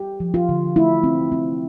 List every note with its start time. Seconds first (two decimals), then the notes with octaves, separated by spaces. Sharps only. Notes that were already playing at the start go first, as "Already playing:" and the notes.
Already playing: G4
0.20 F3
0.34 F4
0.49 D3
0.76 A3 E4
1.04 C4
1.32 C4